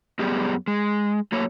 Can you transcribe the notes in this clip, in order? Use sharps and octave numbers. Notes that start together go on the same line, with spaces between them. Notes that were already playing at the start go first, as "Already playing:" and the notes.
F#2 G3 B3 G4 G#4 D5
G#3
F#3 A3 A#3 C#5